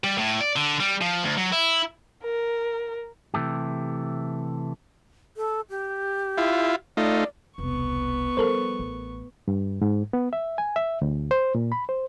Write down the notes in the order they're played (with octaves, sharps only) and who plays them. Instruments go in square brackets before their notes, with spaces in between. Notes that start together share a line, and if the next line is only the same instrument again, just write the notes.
[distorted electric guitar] G3
A2
D5
D3
G3
F3
D2
F#3
E4
[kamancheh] A#4
[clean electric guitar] C3 E3 A3 G4
[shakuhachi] A4
G4
[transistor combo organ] E4 F4
[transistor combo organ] A3 D#4 F4 [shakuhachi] D5
[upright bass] E1 C2 [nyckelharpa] B3 C#6
[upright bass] F3 G3 [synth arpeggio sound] A4 A#4 C5
[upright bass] A1
[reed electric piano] G2
G#2
B3
E5
G#5
E5
D2
C5
A#2
B5
C5